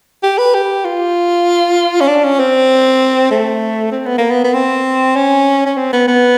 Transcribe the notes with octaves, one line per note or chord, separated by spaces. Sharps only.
G4
B4
G4
F4
C#4
D4
C#4
C4
A3
C4
B3
A#3
B3
B3
C4
C#4
C#4
C4
B3
B3